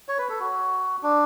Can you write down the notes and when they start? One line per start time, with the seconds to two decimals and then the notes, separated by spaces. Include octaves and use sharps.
0.08 C#5
0.18 B4
0.30 A4
0.40 F#4
1.03 D4